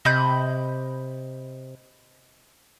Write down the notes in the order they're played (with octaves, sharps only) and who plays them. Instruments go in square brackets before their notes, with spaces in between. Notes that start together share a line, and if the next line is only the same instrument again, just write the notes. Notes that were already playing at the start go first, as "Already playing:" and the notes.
[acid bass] C3 [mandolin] D#5 B5 G6